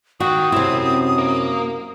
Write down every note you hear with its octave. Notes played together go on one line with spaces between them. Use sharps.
D#3 F#4 G5 D#6
F#2 C3 C4 E4
A#3